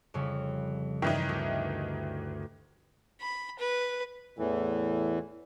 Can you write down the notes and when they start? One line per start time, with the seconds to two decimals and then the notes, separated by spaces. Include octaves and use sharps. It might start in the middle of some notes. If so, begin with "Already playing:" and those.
0.14 F2 C#3 G3
1.02 G2 D#3 E3 D#4
1.29 D2
3.21 B5
3.59 B4
4.39 E2 A2 E3